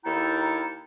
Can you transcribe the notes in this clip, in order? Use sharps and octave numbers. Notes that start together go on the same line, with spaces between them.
D#2 E4 A4 G5 A#5